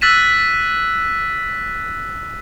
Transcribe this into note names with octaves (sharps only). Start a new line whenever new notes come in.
E6 F#6 A6 B6 D#7 E7